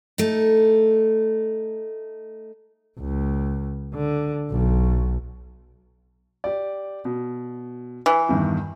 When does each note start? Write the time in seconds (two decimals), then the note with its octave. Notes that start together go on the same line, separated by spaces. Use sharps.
0.18 A3 D#4
3.00 C#2
3.94 D3
4.51 B1
6.44 G4 D5
7.05 B2
8.06 E3
8.29 E2 G2 D#3